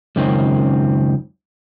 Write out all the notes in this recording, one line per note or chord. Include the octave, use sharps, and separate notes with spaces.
C#2 F#2 D#3 C4